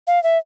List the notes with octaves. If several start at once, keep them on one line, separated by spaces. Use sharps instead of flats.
F5
E5